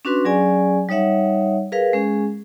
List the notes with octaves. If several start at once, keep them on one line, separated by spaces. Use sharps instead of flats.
C#4 D4 F#4 B4 C6
F#3 C#4 G#4 D5 G#5
G3 D#4 C#5 E5 F#5
G#4 A#4 B4 F5
G#3 C#4 G#4